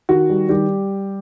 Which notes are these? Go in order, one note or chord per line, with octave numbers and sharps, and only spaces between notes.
D#3 F#4
G3
D#3 G3 G4